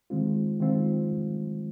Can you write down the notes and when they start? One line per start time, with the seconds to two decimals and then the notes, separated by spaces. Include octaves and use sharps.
0.10 D#3 G#3 C4 F4
0.60 D#3 G#3 C4 F4